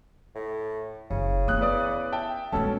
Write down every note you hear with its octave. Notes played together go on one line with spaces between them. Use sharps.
A2
F#1 C#3
B3 E4 D#6 F#6
B4 D5 D#6
E5 G5 A5
B2 G#3 A3 C#4 A4 A5